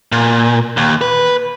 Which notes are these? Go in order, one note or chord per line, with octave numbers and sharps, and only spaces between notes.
A#2
D#2
B4